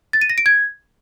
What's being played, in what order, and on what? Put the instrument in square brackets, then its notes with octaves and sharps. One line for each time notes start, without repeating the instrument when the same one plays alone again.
[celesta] A6
D#7
A#6
D7
G#6